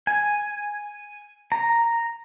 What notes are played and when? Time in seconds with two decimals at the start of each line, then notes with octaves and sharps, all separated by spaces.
0.07 G#5
1.52 A#5